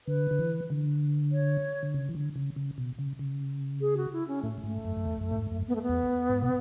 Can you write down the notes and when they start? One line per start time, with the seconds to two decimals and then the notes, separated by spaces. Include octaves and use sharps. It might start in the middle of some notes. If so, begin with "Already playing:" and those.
0.07 D3 B4
0.31 D3
0.39 E3
0.70 D3
1.32 C#5
1.83 D3
1.94 C#3
2.09 E3
2.15 D3
2.36 C#3
2.56 C#3
2.78 B2
2.99 C#3
3.19 C#3
3.81 G#4
3.97 F#4
4.13 E4
4.28 C#4
4.43 A2 A3
4.64 G#2 A3
4.85 F#2
4.97 F#2
5.06 E2
5.21 F#2
5.31 A2
5.36 G#2
5.52 F#2
5.68 B3
5.75 A3
5.82 B3
5.89 E2
6.29 G#2
6.42 B2